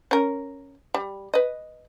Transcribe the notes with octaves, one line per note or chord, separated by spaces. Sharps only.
C#4 A#4
G3
B4 D#5